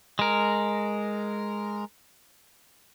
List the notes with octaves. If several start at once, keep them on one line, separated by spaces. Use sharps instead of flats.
G#3 A#4